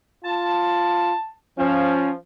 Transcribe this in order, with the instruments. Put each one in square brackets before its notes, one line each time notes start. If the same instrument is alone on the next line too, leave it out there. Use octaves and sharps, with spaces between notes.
[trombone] F4 [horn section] A5
[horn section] F3 [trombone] C#4